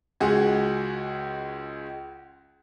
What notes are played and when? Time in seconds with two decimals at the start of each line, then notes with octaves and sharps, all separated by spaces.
0.20 C#2 G#3 F#4 G#4